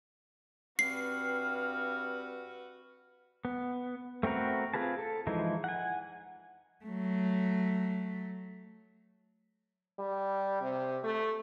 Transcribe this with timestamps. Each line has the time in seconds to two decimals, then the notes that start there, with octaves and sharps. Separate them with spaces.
0.79 G2 C4 F#4 B4 F6 C7
3.45 B3
4.23 A3 C4 F#4 A#4 B4
4.74 C4 F4 G#4 B4 A5
4.99 A4
5.27 E3 F3 G#3 D#4 E4
5.64 F#5 G#5
6.85 F#3 A3
9.99 G3
10.61 C3
11.04 A3